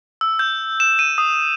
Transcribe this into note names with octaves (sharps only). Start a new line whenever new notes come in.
E6
G6
E7
D#7
D#6